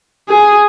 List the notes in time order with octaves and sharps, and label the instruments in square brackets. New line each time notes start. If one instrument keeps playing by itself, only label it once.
[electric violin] G#4